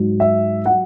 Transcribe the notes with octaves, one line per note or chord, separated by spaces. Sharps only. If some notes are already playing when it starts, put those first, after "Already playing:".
Already playing: G#2 F#3
E5
F#3 F#5